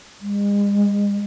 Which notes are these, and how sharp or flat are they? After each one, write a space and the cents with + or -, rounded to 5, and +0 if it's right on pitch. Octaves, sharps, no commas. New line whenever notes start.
G#3 -40